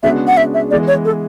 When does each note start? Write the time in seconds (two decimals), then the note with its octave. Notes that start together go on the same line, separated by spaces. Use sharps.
0.03 C#3 G#3 B3 D4 F#4 E5
0.27 F#5
0.37 E5
0.54 E5
0.71 E3 G#3 B3 D5
0.88 C#5
1.05 A4